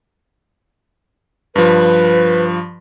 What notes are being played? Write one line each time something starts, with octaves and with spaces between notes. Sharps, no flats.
G2 F3 B4